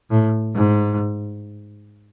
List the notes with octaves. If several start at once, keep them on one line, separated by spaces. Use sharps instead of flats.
A2
G#2